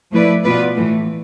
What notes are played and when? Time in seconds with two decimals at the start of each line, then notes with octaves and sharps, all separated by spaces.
0.12 F3 A3 E4 B4 D5
0.43 B2 B3 F4 B4 D5
0.76 A2 E3 A3